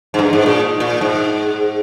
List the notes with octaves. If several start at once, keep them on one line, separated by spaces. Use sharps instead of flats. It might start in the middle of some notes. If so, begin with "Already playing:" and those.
G#2
G2
G#2
A#2
A#2
G#2